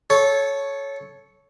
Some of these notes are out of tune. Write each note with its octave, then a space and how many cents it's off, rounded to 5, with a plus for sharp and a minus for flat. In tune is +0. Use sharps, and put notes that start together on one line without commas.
A4 -15 C#5 +0